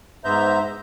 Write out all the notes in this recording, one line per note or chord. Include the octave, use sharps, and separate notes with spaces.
G#2 B3 C5 E5 A#5 G6